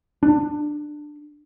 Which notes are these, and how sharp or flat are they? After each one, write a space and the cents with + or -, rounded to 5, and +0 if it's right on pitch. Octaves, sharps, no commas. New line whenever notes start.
D4 +15